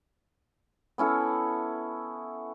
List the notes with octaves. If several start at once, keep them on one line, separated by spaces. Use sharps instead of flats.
B3 C#4 E4 A4